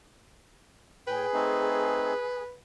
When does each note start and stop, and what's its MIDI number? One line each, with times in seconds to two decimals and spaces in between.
1.07 1.26 45
1.07 2.41 68
1.07 2.56 71
1.07 1.26 79
1.33 2.14 57
1.33 2.14 60
1.33 2.14 63